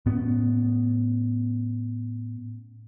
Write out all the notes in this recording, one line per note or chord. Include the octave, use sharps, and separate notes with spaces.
A2 B3 C#4